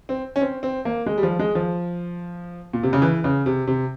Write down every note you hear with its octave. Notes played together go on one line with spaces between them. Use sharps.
C4
C#4
C4
C4
A#3
G#3
G3
F3
G#3
F3
A#2
C3
C#3
E3
C#3
C3
C3